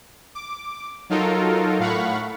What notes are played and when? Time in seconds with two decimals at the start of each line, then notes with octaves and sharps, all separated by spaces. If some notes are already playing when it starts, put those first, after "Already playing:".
0.35 D6
1.09 F#3 D#4 F4 A4 A#4
1.79 A2 F5 F#5 B5 C#6